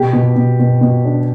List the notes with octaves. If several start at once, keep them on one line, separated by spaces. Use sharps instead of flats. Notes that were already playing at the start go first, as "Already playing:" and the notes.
Already playing: B2 G4
B2
B2
B2
B2
D4